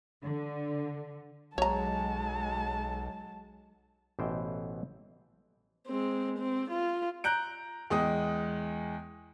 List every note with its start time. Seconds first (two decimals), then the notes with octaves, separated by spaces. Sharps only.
0.23 D3
1.58 B1 F#3 G#3 C#5 A5 A#5
4.19 A1 B2 E3 C5 G5
5.87 G#3 C4
6.39 C4
6.71 F4
7.24 A#5 F#6 G6 D7
7.90 E2 G#3 G5 D#6